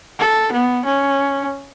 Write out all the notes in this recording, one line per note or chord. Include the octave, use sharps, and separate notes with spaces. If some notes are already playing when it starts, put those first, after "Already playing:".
A4
B3
C#4